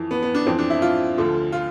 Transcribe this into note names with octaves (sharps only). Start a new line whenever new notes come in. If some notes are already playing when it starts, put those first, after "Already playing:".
Already playing: F2 E3
B3
B3
D4
F2 E3 C4
D4
E4
F4
D2 D3 F3
F4